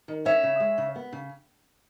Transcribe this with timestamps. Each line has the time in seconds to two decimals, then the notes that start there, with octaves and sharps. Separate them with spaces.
0.08 D#3
0.25 C#4 C#5 E5
0.43 C#3
0.60 G#3
0.78 C#3
0.96 B3
1.13 C#3